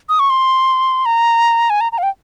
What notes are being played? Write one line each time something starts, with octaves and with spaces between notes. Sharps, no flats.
D#6
C#6
C6
A#5
G#5
A#5
A#5
F5
G5